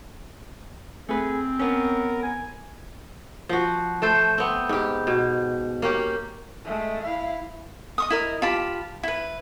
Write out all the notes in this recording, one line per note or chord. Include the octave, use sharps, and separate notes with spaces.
A3 C4 G#4 B4
B3 C#4 A#4
G#5
F3 F#4
A3 A4 C5
B3 C4
G#2 G4
B2
A#3 C#4 G4
G#3 A3
E4 F5
D#5 C#6 D#6
E4 A#4 D#5
F4 G4 A5 B5
E4 B4